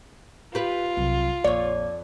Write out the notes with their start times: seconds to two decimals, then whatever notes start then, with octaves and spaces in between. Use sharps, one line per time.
0.55 F4 G4 B4
0.97 C2 F#3
1.44 A#1 F2 C#5 D5